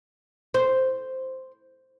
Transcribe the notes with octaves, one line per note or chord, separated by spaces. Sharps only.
C5